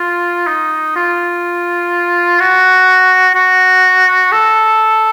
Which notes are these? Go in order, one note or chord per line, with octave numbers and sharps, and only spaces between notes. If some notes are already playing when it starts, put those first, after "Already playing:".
Already playing: F4
D#4
F4
F#4
F#4
A4